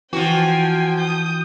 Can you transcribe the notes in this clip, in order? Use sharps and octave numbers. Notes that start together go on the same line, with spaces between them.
E3 F3 F#4 G5 G#5
D#6 G6